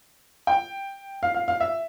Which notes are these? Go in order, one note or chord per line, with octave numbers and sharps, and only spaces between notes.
G5
F5
F5
F5
E5